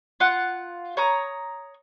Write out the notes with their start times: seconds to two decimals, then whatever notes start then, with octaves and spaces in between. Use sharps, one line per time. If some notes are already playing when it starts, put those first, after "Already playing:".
0.20 F4 F#5
0.97 C#5 A#5 D#6